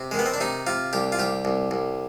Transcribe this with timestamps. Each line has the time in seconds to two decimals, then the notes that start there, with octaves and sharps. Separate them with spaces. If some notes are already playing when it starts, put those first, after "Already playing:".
Already playing: C3
0.11 D#3 G#3
0.19 B3
0.26 C4
0.34 D4
0.40 C3 D#4
0.67 C3 F4
0.93 C2 G4
1.12 F4
1.19 C2 G4
1.45 C2
1.71 C2